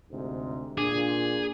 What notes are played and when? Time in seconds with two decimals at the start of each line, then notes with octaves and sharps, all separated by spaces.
0.11 D2 G#2 C3
0.78 A#2 D4 G#4